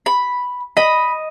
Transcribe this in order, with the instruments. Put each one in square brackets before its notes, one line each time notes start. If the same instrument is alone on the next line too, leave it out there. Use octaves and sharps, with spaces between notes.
[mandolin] B5
[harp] D#5 [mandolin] B5